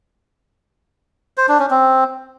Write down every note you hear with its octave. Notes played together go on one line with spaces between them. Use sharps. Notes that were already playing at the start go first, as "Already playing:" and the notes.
C5
D4
C#4
C4